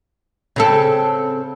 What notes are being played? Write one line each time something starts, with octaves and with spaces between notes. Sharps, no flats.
C#3 C4 A4